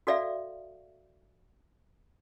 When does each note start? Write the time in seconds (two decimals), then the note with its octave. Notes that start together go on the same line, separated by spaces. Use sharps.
0.07 F#4 A4 D5 E5 F5